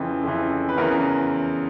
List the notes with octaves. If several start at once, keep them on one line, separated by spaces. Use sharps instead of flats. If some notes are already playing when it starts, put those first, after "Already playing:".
Already playing: F2 C#3 E3
F2 C#3 E3
B4
E2 C#3 E3 A#4